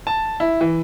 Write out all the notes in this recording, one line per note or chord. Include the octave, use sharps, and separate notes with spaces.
A5
E4
E3